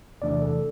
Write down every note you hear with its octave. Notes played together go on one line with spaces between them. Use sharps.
E2 C3 E3 A3 D4 D5
A4